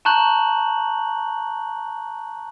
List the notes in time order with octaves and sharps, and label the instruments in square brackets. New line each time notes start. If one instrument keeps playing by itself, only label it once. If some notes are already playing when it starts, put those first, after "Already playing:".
[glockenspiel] A5 A#5 C#6 F#6 G6 F#7